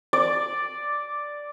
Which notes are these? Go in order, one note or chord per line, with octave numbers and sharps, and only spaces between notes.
D5